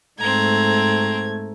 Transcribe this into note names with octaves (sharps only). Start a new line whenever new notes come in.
G#2 A3 C4 A#5 G#6